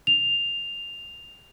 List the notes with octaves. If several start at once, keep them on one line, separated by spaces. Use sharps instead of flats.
F7